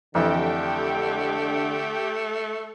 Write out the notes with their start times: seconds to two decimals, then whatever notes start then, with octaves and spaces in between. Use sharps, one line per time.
0.15 F2 D3 E3 A3 G4 G5